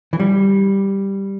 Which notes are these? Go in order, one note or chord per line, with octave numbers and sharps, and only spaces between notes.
E3
G3